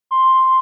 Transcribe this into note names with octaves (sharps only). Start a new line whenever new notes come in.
C6